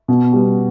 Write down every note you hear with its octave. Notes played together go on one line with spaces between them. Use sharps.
B2
G3 B3